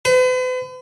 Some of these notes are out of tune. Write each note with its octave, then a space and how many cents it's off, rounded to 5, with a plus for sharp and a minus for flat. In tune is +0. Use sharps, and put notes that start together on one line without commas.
B4 +45